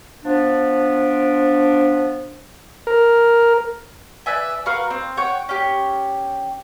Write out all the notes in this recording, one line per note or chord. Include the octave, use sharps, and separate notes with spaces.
F3 B3 D4
A#4
B4 D5 E5 G#5
F#4 A#4 B4 F5
C4
C#5 F#5 G5
C#4 G4